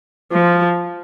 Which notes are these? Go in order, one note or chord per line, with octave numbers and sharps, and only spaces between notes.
F3